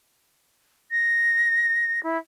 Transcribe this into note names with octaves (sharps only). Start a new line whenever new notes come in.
A#6
E4